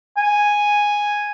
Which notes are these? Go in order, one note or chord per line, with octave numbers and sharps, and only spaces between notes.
G#5